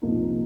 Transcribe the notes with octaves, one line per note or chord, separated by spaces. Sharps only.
C2 A#2 F3 A#3 D#4